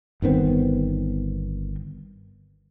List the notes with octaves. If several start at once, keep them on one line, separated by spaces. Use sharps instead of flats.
G1 D#3 B3 C4